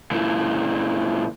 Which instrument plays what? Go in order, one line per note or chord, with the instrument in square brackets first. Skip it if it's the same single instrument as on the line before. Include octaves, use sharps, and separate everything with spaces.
[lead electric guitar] A#2 E3